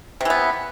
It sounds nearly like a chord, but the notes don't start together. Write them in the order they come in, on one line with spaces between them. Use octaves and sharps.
C3 E3 B3